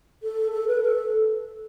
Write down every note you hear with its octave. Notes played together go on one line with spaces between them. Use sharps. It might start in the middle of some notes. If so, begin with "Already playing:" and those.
A4
A4
B4
A4